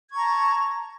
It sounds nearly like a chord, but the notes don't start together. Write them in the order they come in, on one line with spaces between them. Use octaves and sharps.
G#6 C#6 A#5 A5